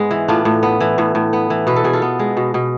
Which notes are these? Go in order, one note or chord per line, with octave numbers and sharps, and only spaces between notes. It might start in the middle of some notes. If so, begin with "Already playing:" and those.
Already playing: G#2 G#3 B3
E3
A2 D4 F4
A2
B3
E3
A2
A2
B3
E3
B2 B4
A4
B2 G#4
F4 A4
B3
G#3
B2
B2